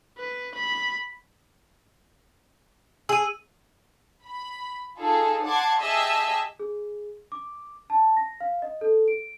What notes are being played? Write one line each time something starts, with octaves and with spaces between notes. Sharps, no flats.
B4
B5
G#4 E6 D#7
B5
D#4 F4 G#4 A4
F#5 A5 C6 D6 G#6
G4 G#4 D#5 E5 A5 E6
G#4
D6
A5
A#6
F5
D#5
A4
D7